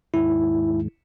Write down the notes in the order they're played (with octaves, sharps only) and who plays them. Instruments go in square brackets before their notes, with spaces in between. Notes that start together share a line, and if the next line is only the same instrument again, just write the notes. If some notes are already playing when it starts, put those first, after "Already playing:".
[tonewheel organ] D#2 G#2 [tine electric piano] E4